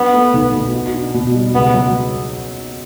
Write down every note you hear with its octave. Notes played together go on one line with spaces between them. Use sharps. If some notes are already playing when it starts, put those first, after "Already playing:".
Already playing: F#3 B3 D4
A3
B1
B2
F#4
D4
B2
G3
C#2 B3
F#3